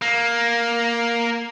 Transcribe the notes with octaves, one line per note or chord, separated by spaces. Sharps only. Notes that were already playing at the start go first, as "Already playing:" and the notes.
A#3